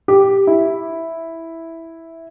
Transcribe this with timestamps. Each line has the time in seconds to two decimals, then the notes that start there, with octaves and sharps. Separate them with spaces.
0.08 G4
0.47 E4